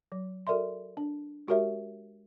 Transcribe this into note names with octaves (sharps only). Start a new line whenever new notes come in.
F#3
F#4 A4 A#4 D5 E5 C6
D4
G#3 F#4 G4 A#4 C#5 E5